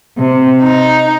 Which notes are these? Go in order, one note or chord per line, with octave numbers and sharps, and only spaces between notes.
C3
D#4